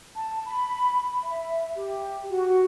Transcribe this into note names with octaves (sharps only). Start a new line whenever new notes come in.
A5
B5
E5
G4
F#4